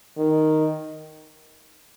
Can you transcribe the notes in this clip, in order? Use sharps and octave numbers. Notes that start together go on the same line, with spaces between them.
D#3